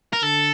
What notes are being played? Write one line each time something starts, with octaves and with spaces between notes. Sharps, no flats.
A#4
D3 A4